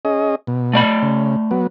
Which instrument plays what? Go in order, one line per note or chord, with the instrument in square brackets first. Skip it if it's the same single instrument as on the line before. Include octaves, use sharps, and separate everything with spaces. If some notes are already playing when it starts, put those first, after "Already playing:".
[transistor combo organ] C#4 G#4 D#5
B2
[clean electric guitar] A3 D5 B5
[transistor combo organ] C#3
F#3 B3